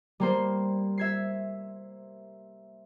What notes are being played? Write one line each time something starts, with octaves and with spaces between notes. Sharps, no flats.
G3 A#3 C5
E5 G#6 C7